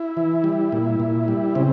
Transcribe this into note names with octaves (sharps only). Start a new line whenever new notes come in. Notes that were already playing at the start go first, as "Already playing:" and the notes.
Already playing: E4
E3
G3
A#2
A#2
G3
C#3 C4